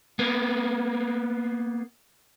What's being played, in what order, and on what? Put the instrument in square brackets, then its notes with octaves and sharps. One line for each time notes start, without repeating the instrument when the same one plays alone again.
[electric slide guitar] A#3 B3